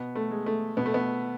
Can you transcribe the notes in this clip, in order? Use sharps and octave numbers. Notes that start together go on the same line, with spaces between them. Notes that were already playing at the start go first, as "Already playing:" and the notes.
Already playing: B2 B3
A3
G#3
A3
B2 B3
A3
B3